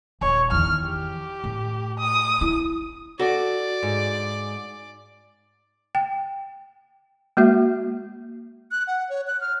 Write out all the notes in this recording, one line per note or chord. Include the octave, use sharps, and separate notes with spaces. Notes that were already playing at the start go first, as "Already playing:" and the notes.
D#1 C#5
E2 D#3 F6
G4
A2
D#6
E4
F#4 A4 D5
G#2
G5
G#3 A#3 F#4 E5
F#6
F#5
C#5
F#6
F6